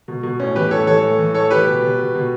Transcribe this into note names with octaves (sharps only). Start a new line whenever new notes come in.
B2
B2
A2 C#4
E3 G4 B4
A2 A4 C#5
E3 A4 C#5
A2
E3
A2 A4 C#5
E3 G4 B4
B2
B2
B2
B2